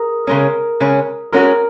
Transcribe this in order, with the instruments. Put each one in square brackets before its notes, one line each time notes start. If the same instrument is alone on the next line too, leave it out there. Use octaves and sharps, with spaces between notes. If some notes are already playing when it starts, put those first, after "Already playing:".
Already playing: [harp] G#4 A#4
[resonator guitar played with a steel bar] C#3 G#3 C#4 [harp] A#4
[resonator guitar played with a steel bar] C#3 G#3 C#4
[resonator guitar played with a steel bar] G#3 C#4 F#4 [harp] A#4